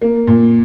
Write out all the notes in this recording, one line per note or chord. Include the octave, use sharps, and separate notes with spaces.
A#3
A#2